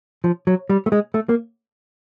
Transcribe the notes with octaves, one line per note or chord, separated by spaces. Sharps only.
F3
F#3
G3
A3
G#3
A3
A#3